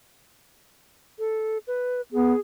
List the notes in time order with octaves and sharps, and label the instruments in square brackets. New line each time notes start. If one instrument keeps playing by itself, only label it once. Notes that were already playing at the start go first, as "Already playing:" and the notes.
[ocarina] A4
B4
[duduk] B3 [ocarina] G#4